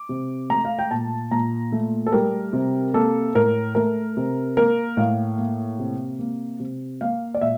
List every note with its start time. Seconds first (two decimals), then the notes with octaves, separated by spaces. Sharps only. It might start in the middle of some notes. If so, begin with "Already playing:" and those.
Already playing: D6
0.09 C3
0.50 A3 A#5
0.65 F5
0.79 G5
0.91 A#2 A5
1.31 A#2 A#5
1.72 A3
2.06 A4
2.12 G3 A#4
2.53 C3
2.94 A#3 A4
3.35 A2 A#4
3.75 A3 A#4
4.17 C3
4.57 A#3 A#4
4.97 A2 F5
5.38 A#3
5.79 C3
6.19 A#3
6.60 C3
7.01 A#3 F5
7.34 D5
7.41 A#2 E5